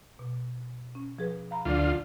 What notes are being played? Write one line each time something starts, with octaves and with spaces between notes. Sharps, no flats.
B2
C#4
F3 G#4 B4
F5 A#5 B5
D2 F#3 D4 F4 D5